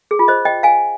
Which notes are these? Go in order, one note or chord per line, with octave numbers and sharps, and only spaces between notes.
G#4
F4
C5 D#5
D#5 G5
F5 G#5